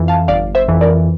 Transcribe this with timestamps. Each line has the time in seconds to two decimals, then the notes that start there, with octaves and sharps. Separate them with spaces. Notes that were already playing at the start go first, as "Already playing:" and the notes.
Already playing: F2 E3
0.08 F5 A5
0.28 G1 D5 F5
0.55 C5 E5
0.68 F2 E3
0.81 A#4 D5